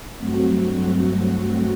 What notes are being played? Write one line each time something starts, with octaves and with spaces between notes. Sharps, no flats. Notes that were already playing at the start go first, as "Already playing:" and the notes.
G2 F#3 A3 C4 F#4